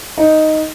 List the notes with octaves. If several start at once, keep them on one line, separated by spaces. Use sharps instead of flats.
D#4